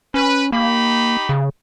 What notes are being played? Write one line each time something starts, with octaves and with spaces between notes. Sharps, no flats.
C#4 B4
A#3 D#4 G4 B5
C#3